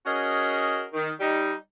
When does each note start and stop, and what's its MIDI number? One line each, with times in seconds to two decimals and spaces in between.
0.05 0.83 61
0.05 0.83 66
0.05 0.83 68
0.05 0.83 70
0.05 0.83 75
0.93 1.10 51
1.20 1.52 55
1.20 1.52 63